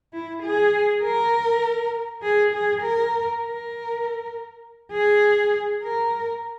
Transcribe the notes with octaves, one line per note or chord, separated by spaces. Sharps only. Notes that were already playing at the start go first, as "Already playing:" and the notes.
E4
G#4
A#4
G#4
G#4
A#4
A#4
G#4
A#4